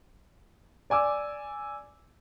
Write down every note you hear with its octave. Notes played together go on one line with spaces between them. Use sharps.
D5 G#5 D6 E6